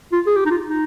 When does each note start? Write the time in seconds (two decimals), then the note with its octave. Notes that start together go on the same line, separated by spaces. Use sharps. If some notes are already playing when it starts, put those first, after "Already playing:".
0.12 F4
0.27 G#4
0.36 G4
0.46 D#4
0.51 F4
0.67 D#4